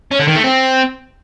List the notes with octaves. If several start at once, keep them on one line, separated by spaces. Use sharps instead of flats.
C#4
D3
D#3
A3
C4